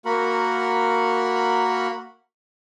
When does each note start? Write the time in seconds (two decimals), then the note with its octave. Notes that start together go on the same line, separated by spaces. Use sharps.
0.05 A#3 F#4 A#4 F#5 B5